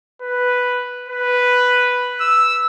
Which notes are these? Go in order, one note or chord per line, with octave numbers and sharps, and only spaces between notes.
B4
B4
E6